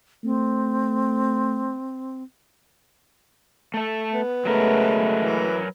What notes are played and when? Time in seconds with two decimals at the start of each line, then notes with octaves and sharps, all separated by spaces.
0.24 A3 C4
3.74 A3 A4
4.13 B3
4.45 C#3 F#3 G#3 A3 A#4 B4
5.20 E3